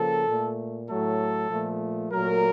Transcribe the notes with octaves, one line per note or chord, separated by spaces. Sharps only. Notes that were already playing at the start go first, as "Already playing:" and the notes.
Already playing: C#3 F3 A#3 A4
A#2 A3
A2 F#3 A3 A4
A#2 F3 A3
A#2 F#3 A3 A#4